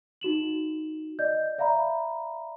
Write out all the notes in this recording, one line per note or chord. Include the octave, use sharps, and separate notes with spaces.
D#4 F#4 E7 F#7
D5 D#5 G6
D5 E5 F5 A#5 B5